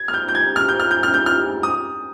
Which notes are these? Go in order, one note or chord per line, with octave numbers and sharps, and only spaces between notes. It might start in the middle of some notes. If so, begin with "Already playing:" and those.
Already playing: G#6
F6
G6
G6
G#6
F6
G6
F6
G6
F6
G6
F6
D#6